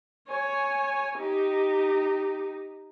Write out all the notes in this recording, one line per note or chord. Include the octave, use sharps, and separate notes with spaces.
C#5 G#5
D#4 G4